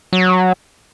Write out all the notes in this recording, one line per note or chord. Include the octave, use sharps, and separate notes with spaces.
F#3